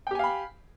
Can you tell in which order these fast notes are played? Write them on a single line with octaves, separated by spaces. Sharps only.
G5 G4 G#5 F5 B5